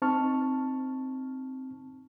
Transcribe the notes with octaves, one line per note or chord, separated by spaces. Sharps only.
C4 D#4 A5 C#6 F6